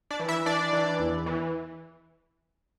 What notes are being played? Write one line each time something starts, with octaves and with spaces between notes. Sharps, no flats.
D4 D5
E3
E4 E5
E3 D4 D5
E3
E2
E3